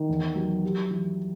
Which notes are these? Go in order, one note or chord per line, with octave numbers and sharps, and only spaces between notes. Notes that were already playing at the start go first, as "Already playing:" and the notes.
Already playing: D#3
E2
F#3
G3
E3